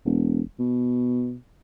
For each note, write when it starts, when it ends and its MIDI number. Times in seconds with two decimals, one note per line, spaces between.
0.05 0.41 28
0.59 1.35 47